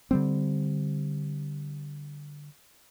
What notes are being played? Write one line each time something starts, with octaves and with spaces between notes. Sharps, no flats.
D3 G3 C4